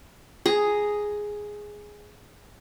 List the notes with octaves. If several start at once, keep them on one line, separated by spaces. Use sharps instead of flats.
G#4 A#5